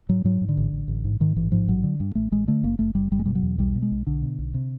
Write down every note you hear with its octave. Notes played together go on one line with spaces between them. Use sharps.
G#2 F#3
G#2 F#3
G#2
D3
A1
A1
A1
G#2
G#2 D#3
A1 E3
G#2 F3
A1 F#3
D3
G2
A1 A3
A1 G#3
D3 A3
F#1 A#3
F#1 A3
F#1 G3
F#1 G3
G#3
B2 G3
F#3
E2
B1 G3
B2
G#3
B1
B1 D3
B2
B1
C3